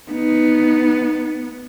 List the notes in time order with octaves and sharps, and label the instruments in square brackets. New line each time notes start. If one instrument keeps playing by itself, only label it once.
[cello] B3 [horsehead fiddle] D#4